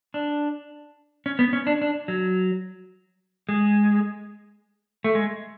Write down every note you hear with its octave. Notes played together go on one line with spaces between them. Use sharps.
D4
C#4
B3
C#4
D4
D4
F#3
G#3
A3
G#3